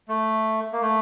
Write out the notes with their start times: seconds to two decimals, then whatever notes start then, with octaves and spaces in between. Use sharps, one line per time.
0.08 A3
0.73 A#3
0.82 A3